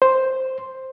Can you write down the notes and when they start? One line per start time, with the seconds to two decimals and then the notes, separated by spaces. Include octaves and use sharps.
0.02 C5